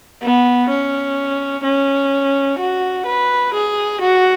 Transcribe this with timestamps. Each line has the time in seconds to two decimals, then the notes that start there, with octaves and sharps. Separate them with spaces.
0.22 B3
0.69 C#4
1.64 C#4
2.58 F#4
3.06 B4
3.54 G#4
4.00 F#4